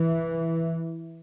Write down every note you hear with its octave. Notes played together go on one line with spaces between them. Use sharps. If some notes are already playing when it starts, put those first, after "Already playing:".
Already playing: E3